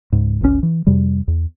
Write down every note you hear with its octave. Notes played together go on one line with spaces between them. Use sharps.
C#2 G#2
G1 C#2 A#2 C#4
E3
F2 C3 G3
E2